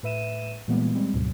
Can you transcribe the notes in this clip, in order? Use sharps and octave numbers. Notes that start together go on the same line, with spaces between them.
A2 B4 E5 D#7 E7
A#2 E3 G3 G#3 A#3 B3
G3 G#3 C4
D2 G#2 B2 F#3